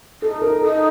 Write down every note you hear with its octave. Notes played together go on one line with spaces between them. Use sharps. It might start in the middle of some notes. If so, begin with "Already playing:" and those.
D#4 A4
A#4
D#4 A4